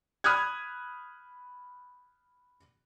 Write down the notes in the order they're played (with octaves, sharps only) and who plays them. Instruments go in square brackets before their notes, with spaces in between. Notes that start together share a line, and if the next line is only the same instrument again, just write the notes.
[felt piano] B5 D#6 F6 F#6 G#6